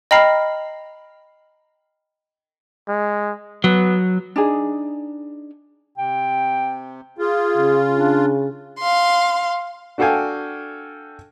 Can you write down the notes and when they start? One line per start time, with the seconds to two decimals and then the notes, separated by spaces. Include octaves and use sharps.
0.11 D#5 G5 A#5 B5 F6 C7
2.88 G#3
3.64 F#3 B3
4.36 D4 D#4 G#4
5.98 C3 G5
7.18 F4 G#4
7.57 C#3
7.98 D4
8.79 F5 C6
9.98 D4 F#4 A4 F5 G5 G#5